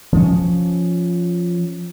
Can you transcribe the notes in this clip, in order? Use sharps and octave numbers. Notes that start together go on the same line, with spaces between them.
F3 C#4